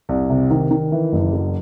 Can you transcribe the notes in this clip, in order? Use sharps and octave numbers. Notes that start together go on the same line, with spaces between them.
C2
C3
D#3
D#3
E3
F#1
F#3